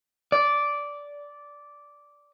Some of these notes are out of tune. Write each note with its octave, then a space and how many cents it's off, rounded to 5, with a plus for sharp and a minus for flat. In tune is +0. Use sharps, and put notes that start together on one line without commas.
D5 -10